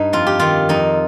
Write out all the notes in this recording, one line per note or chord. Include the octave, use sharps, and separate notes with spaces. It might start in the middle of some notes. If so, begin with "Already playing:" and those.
Already playing: G2 D#4
F2 F4
G4
D#3 F4
F2 D#4